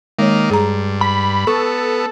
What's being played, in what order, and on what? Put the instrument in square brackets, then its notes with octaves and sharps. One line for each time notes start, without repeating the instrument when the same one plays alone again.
[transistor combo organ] D#3 A#3 [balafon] G#3 C#5
[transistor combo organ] G2 [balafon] G#4 A#5
[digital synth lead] B5
[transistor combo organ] B3 [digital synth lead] A4 [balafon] C#6